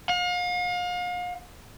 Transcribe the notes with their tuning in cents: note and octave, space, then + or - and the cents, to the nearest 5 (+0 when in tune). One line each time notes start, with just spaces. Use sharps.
F5 +40